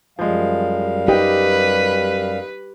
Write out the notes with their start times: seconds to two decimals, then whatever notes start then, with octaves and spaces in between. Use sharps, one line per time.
0.19 F#2 F3 G3 G#3 F5
1.08 D#4 G4 B4 G5